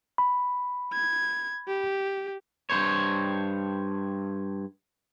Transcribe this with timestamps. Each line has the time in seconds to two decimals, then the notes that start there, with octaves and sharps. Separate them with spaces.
0.18 B5
0.93 G#6
1.68 G4
2.70 G2 A#2 C5 C#5